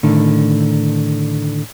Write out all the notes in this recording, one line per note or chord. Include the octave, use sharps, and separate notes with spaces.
A2 D3 D#3